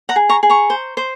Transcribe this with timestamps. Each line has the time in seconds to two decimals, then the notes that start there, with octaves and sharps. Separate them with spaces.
0.09 F#5 A#5
0.16 G#4
0.29 A#5 C#6
0.43 G#4
0.50 A#5 C#6
0.70 C5
0.97 C5